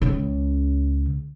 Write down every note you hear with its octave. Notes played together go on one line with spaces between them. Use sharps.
C#2 C#3